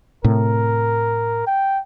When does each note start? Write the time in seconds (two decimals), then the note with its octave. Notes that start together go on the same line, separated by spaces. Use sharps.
0.24 A2 C3 A#4
1.47 G5